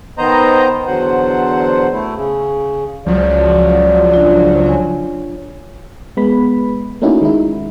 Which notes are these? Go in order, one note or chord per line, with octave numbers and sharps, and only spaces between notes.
D#3 B3 C5 D#5 A#5
E2 D3 F#3 C5 F#5
A3 E4
C#3
C#2 F3 F#3 D5
D4 F4
C#5 G#5
G#3 B3 B5
A3 A#3 C#4 D#4 E4 F#4
D#3 G#3 D#4 E4